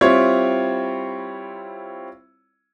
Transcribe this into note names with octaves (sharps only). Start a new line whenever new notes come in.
G3 C4 E4 F4 C#5 G#6